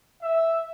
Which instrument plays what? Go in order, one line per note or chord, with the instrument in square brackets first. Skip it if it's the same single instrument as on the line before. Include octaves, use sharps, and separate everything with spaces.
[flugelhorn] E5